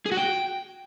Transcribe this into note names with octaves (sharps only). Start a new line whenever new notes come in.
G#4
F#4
G5